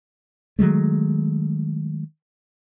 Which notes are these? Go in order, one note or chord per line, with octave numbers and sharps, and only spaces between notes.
D#3 F#3 G#3 A3